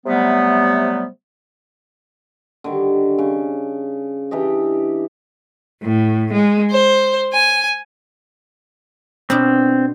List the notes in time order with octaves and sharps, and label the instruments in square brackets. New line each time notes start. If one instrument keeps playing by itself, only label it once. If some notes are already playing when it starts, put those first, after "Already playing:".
[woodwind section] C3 F#3 G3 A3 B3
[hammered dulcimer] D3 D#3 G3
C#3
E3 D4 G4 D#5
[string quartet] A2
G#3
C5
G#5
[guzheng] B2 D4 [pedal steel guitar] C4